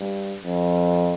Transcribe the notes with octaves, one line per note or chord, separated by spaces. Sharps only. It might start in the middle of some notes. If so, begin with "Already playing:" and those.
Already playing: G2
F2